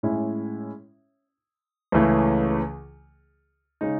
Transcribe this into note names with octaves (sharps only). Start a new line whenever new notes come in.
A2 G#3 C#4 E4
C#2 C#3 E3 A3
C#3 G#3 D#4